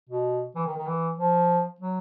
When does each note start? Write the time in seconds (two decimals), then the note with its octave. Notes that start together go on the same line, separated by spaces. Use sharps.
0.09 B2
0.56 E3
0.67 D#3
0.77 D#3
0.87 E3
1.18 F3
1.81 F#3